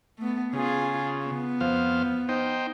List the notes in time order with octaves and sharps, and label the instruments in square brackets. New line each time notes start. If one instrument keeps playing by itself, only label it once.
[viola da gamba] A3 B3
[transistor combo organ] C#3 [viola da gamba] F4 G#4
[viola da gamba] B3
[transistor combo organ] F2 C5 F5
D#4 C5 G5